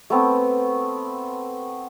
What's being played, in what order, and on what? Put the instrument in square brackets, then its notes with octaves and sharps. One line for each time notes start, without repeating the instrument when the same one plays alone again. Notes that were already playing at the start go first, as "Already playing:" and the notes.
[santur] A3 B3 C4